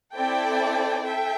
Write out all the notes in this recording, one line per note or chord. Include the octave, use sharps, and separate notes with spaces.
C4 E4 A4 D5 G5
A4 E5 G5